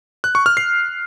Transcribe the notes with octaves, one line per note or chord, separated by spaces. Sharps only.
F#6
C#6
F6
C7